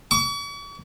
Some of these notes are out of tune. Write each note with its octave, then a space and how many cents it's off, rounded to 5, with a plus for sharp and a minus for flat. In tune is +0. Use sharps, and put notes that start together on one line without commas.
C#6 +45